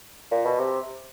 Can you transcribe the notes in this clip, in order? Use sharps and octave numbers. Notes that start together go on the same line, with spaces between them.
A#2
B2
C3